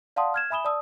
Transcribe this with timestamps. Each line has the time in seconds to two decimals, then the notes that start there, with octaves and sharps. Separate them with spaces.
0.16 D5 F5 F#5 A5 C6 D#6
0.34 F6 G#6 E7
0.50 E5 G#5 B5 D#6 E7 G7
0.65 D5 A5 D#6 E6